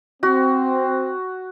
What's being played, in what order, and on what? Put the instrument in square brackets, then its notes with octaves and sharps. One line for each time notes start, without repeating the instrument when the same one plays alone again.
[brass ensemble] C4 [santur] F#4